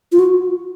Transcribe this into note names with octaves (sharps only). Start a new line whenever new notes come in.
F4
F#4